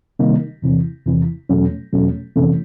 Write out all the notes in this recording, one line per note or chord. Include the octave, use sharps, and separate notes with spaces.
C3 D#3 G3 A#3 D#4
E2 C3 E3
E2 C3 E3
E2 B2 F#3 A3 C#4
E2 B2 F#3 A3 C#4
F2 C3 E3 A3 C#4